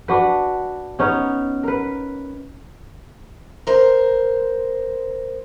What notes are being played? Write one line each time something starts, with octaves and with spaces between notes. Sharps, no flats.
D4 F#4 B4
B3 C#4 D#4
A#4 B4
A#4 C5